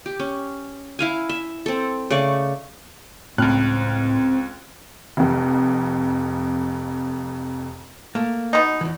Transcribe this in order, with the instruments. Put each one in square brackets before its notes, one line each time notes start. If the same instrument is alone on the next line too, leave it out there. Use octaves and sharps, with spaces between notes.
[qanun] G4
C#4
E4 F5 G#5
E5
C4 A4
C#3 A3 D5 C#6
[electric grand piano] C#2 F6 F#6 [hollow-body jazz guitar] A2 [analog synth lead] C4
[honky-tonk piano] F1 F2
[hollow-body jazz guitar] A3 A#3
[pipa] B2 D#4
[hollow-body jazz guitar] E2 E3